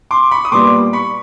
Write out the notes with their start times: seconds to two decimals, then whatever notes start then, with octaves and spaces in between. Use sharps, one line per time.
0.11 C6 D6
0.31 B5 C#6
0.45 D#6
0.52 A#2 G3 B3 C6 D6
0.93 B5 C#6